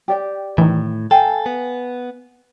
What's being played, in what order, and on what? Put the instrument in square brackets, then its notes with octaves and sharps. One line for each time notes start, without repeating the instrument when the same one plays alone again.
[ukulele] G4 D5 G5
[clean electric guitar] A2 [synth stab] D#3 E3
[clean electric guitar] A4 [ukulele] F5 G5 G#5
[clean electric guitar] B3